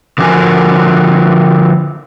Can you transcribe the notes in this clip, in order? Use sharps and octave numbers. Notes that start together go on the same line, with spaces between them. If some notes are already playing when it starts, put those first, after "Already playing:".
D3 F3 C#4 F#4 A#4 G#5